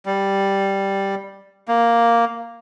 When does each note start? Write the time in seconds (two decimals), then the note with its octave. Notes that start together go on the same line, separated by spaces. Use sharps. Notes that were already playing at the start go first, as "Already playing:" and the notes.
0.06 G3
1.68 A#3